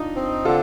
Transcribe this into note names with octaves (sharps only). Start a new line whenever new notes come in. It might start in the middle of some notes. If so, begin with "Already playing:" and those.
Already playing: D4 D#4 F4
C4
D3 F4 A4